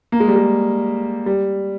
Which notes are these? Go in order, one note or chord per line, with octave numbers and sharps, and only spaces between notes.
A#3
G#3
G3
G#3
G3